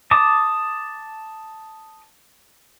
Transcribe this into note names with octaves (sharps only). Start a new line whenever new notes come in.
A5 D6 D#6